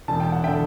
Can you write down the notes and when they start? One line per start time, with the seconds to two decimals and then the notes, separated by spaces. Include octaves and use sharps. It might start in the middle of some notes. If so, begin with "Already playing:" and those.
0.08 E1 A5
0.20 G5
0.32 F#5
0.44 D3 E5 G5